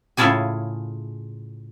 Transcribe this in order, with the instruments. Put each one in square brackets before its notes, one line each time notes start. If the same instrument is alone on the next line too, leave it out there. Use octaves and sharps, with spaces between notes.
[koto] A2 C#3 E4 F4 G#4 G#5